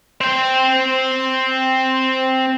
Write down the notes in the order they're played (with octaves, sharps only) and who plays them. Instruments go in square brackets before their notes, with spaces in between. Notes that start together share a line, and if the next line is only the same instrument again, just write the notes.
[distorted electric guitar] C4 G5